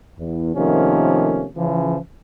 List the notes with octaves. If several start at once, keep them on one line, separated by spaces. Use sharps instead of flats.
E2
C3 D#3 F3 A3 A#3 C#4
C#3 E3 F3